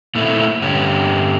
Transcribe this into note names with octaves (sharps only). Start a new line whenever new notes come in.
A#2 D#3 A3 C4 E4
G2 D3 C#4 G4